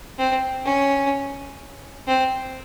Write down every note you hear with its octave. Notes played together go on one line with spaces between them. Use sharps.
C4
C#4
C4